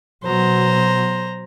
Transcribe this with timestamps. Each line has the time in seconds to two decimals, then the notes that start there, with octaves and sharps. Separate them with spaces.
0.24 B2 F#3 C5 A#5